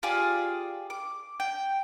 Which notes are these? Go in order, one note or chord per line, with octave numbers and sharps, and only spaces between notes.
F4 G4 G#4 D5
D6
G5